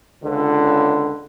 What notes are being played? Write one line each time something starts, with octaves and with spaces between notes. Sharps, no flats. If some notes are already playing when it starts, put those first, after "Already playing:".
C#2 D3